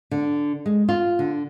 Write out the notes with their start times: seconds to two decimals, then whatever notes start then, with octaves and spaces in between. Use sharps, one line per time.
0.11 D3
0.66 G#3
0.89 F4
1.19 D3